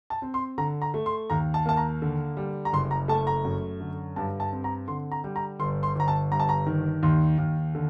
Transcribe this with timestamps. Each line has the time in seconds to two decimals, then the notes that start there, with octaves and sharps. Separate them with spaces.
0.10 A5
0.22 C4
0.34 C6
0.58 D3 A#5
0.82 A#5
0.94 A3
1.06 C6
1.30 D#2 A#5
1.54 A5
1.66 A#3 A5
1.77 A#5
2.02 D3
2.37 G3
2.65 A#5
2.73 F#1 C6
2.91 A#5
3.08 A3 A5
3.27 A#5
3.45 F#2
3.80 D3
4.16 G2 A5
4.40 A5
4.52 C4
4.64 A#5
4.88 D3 C6
5.12 A#5
5.24 G3
5.36 A#5
5.59 G1 C6
5.83 C6
5.95 G1 A#5
6.08 A5
6.32 G2 A#5
6.40 A5
6.49 A#5
6.66 D#3
7.03 D#2 C6
7.38 D#2
7.75 D3